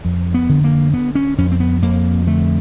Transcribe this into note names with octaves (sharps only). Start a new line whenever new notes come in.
F2
B3
D3
A#3
D3 B3
C#4
F2 C#4
C4
B3
F2 A#3
D3 A3